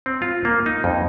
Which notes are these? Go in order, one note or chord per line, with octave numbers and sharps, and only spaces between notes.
C4
F4
A#3
D#4
F2